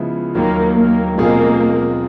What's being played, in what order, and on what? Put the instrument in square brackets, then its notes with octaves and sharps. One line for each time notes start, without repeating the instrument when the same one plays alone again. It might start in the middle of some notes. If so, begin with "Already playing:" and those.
Already playing: [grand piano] C#3 F3 G#3 B3 E4
[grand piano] D#2 D#3 F#3 [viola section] A#3
[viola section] A#3
[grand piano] B2 G#3 C4 F4 G#4 [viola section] A#3